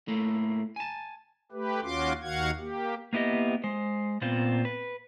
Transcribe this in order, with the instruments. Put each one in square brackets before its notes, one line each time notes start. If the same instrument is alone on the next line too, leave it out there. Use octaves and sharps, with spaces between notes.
[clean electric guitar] A2 A3 A#3
G#5 A5
[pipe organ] A3 G4 B4
D#2 C#4 F4 F#4 C6 D6
D#2 D#3 F#4 F5 F#5 G#6
A#3 G4
[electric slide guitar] A#3 B3 E4 G4 D#5
G#3 C5
A#2 B3 C4 F4
B4